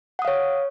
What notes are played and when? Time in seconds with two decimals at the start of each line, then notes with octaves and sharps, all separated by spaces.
0.19 F#5
0.22 D#6
0.25 F5
0.28 C#5